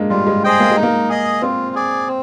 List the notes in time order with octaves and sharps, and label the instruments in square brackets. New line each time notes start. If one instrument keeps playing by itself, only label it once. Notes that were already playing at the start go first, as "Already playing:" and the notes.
Already playing: [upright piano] G#3 A#3 D4
[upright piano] G3 [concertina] F4
[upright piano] G#3
[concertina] G#4 C5 D#5 G5
[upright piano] A#3
[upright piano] G#3 [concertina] D#4
[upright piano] A#3
[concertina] G#4 D#5
[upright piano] C4 [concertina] F4
[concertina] G#4 D5
C4